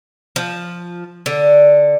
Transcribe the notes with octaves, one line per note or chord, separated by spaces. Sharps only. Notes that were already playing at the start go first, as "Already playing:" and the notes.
F3
D3